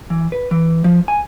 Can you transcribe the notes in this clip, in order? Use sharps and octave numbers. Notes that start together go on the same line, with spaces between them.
E3
B4
E3
F3
G#5